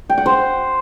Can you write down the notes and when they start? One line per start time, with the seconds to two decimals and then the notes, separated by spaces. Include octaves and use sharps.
0.10 G5
0.18 F#5
0.26 C5